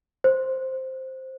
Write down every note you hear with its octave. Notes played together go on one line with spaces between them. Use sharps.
C5